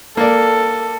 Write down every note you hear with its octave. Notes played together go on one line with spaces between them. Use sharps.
A#3 A4 D5